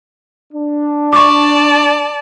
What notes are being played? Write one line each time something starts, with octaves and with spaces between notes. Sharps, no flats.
D4
D5 A5 C#6 D6